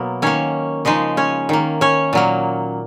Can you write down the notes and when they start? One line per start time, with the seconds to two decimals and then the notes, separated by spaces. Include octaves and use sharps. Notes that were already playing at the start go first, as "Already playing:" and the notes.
Already playing: B2 F#3 A#3 B3 A#4
0.22 D#3 A#3 C#4 C#5
0.85 C#3 F3 G#3 D#4 D#5
1.17 C#4 C#5
1.49 D#3 A#3
1.81 C#4 C#5
2.13 A#2 F#3 A#3